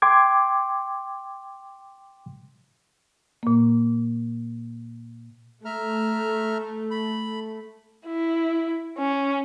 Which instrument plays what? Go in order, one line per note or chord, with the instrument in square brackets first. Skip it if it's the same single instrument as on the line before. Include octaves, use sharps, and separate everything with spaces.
[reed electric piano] G5 C6 D6 G#6
[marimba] A#2 A#3
[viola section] A3 [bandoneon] E5 A#5 F6
[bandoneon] B5
[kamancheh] E4
C#4